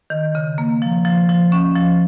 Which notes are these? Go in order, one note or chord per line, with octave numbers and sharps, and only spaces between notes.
D#3
C#3
A#3
F3
F3
F3
C#4
F3